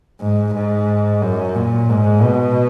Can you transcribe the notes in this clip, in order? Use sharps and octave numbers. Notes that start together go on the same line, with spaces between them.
G#2
G#2
F#2
A#2
G#2
B2